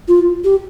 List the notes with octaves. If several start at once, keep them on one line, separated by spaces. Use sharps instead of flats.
F4
G4